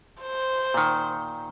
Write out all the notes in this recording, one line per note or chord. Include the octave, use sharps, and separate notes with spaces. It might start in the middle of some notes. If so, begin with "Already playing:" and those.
C5
A#2 D#3